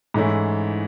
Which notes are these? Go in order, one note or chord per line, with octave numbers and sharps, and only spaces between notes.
G#2 E3 A3 C#4 E4